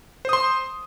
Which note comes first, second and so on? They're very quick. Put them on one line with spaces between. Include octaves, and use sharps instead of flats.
C5 D#6 C6